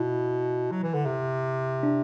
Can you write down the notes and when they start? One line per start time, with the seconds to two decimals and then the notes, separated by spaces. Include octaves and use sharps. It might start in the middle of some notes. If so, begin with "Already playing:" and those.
Already playing: B2 E4
0.71 F#3
0.83 E3
0.94 D3
1.05 C3
1.83 D4